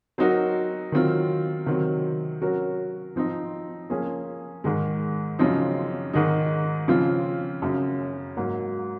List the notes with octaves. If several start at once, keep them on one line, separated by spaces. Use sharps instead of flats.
F#3 C4 D#4 F#4 A#4
D#3 F#3 C4 F4
C3 D#3 F#3 C4
F#3 C#4 F#4 A#4
F3 C4 D#4
F3 A#3 C#4 G#4
G#2 D#3 G#3
F#2 C#3 F3 C4 D#4
G#2 D#3 G#3 D#4
C#3 F3 C4 F4
F#2 C#3 F#3
G#2 F#3 A#3